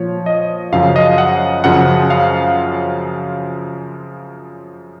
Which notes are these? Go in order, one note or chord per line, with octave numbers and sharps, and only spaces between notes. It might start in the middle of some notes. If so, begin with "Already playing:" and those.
Already playing: A#2 F3 C#5
D#5
F#2 C#3 F3 F5
D#5
F#5
F#2 C#3 F3 F#5
F5